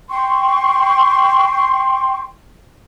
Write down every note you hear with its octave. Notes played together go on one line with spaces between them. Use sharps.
G5 C6 C#6